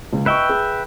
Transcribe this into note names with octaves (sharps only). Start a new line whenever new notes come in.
C#2
B4 D#5 E5 G5 C#6
G#4